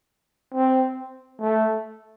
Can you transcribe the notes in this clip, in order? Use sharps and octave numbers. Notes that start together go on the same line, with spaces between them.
C4
A3